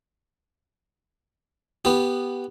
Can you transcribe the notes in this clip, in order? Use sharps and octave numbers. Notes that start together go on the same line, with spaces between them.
B3 G4